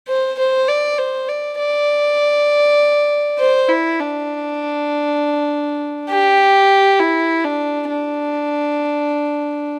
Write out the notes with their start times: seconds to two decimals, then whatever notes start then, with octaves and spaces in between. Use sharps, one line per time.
0.08 C5
0.39 C5
0.69 D5
0.98 C5
1.28 D5
1.59 D5
3.39 C5
3.69 E4
4.00 D4
6.10 G4
7.00 E4
7.44 D4
7.90 D4